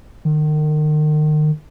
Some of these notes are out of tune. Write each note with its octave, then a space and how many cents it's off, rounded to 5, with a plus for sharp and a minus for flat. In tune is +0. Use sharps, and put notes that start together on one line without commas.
D#3 -35